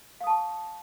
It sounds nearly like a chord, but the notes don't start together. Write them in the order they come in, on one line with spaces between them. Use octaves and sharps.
F5 D#6 A5 C#6